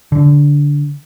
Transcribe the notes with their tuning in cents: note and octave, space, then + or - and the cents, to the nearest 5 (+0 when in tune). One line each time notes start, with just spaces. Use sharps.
D3 -15